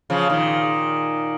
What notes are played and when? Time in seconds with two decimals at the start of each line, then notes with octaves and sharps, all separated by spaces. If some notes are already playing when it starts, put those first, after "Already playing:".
0.10 C#3 F3
0.30 A#2 D#3